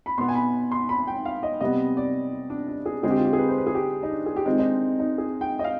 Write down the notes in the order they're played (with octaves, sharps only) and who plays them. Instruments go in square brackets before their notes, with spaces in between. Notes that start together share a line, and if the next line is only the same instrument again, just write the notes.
[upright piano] B5
B2 C6
B3
G#5
B5
C6
B5
G5
F5
D#5
C3 G3 B3 D#5
D5
D4
D4
G#4
D3 G#3 C4 G#4
G4
F4
G4
G#4
B4
C5
B4
G#4
G4
D#4
D4
G#4
G4
D#3 G#3 C4 F4
D#4
D4
D#4
G#4
G5
D#5
F5